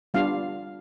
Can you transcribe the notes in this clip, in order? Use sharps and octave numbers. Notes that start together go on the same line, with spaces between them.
G3 B3 D4 F4 F5